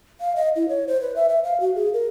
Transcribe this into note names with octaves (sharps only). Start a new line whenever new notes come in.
F5
D#5
E4
C#5
C5
B4
E5
E5
F5
F#4
G#4
A#4